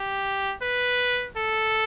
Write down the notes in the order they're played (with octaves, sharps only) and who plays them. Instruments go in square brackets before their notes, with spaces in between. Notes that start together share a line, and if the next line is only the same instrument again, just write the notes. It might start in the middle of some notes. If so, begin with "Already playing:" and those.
Already playing: [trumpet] G4
B4
A4